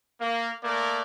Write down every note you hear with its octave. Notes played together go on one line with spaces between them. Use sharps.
A#3
A3 A#3 A#4 D5